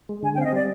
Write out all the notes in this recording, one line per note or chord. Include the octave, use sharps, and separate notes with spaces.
G#3
D3 G#5
G5
C4 F5
D#5
G3 D5